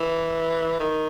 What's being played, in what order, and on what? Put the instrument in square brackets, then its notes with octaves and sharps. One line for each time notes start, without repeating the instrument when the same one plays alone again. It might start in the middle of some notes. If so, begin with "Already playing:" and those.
Already playing: [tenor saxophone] E3
D#3